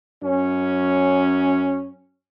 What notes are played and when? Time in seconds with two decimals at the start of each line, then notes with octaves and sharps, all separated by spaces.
0.22 F#2 C#4